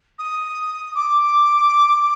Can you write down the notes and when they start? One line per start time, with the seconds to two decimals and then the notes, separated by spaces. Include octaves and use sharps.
0.19 D#6
0.95 D6